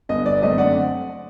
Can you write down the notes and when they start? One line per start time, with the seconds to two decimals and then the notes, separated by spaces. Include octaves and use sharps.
0.09 G1 D#5
0.26 D5
0.42 F#2 D3 A3 C4 D#5
0.58 D5 F#5